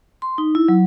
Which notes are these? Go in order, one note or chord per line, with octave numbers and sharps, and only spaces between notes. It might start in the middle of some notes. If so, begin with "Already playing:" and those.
C6
D#4
E4
F#3